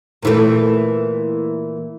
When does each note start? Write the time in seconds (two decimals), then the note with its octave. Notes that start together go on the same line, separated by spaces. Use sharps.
0.23 A#2 E3 A3